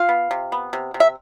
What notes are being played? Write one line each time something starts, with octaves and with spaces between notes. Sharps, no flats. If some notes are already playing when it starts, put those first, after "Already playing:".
Already playing: F4 F5
B3
C3
B3
C3
C3
E5